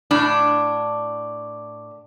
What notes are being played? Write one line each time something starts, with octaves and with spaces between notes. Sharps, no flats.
A2 D4